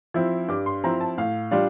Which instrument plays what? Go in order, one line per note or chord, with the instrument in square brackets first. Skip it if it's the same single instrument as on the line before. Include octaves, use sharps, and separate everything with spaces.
[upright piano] F3 C4 E4
G2 D6
C6
F3 C4 E4 A#5
A5
A2 F5
G3 D4 F4